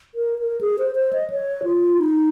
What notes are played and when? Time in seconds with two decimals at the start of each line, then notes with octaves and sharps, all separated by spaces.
0.15 A#4
0.39 A#4
0.61 G#4
0.78 C5
0.95 C5
1.13 D#5
1.30 C#5
1.64 F4
1.99 D#4